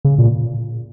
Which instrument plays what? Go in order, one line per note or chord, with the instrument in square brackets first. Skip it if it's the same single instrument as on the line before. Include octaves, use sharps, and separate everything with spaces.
[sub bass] C#3
A#2